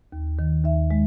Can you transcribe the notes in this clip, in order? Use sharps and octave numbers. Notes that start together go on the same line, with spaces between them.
D#2
D#3
D#2 E5
G#3